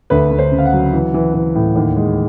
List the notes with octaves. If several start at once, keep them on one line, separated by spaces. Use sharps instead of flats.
D2 B4
D2
C5
C#3
F5
F#5
F#3
E3
E3
E3
A2
D#2
G#3